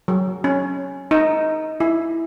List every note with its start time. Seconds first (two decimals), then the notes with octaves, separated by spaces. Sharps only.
0.08 F#3
0.44 C#4
1.11 D#4
1.80 E4